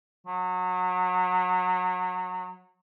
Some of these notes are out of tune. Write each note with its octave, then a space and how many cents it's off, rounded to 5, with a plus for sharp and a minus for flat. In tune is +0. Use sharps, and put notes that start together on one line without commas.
F#3 -25